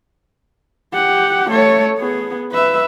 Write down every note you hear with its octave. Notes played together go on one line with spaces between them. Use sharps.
G4 F#5
A3 C#5
B3 G#4
B4 E5